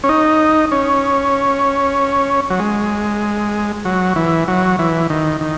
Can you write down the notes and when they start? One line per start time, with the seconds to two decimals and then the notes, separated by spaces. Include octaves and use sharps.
0.04 C#4
0.09 D#4
0.72 C#4
2.50 F#3
2.59 G#3
3.85 F#3
4.16 E3
4.48 F#3
4.79 E3
5.10 D#3
5.41 D#3